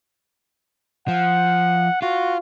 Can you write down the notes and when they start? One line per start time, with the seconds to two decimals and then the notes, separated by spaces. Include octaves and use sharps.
1.08 F3 F#5
2.02 F4 F#4